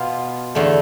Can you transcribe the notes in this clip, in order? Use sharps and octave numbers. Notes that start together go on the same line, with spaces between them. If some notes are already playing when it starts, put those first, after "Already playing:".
Already playing: B2 B3 F4
E2 D3 A3